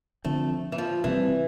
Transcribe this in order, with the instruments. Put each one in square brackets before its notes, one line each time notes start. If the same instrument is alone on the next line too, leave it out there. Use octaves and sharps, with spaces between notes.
[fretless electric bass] D3 F3 C4 [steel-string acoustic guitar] A3
[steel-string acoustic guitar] E3
F3
[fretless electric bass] C3 G3 C4 [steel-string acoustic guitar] E3